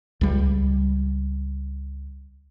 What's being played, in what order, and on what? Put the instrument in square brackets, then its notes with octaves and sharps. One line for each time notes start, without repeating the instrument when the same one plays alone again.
[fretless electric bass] C#2 G3